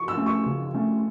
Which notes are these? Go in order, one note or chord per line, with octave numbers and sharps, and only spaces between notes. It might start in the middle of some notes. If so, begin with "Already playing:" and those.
Already playing: C#6
E6
A3 C#4
C#6
C#3
A3 C#4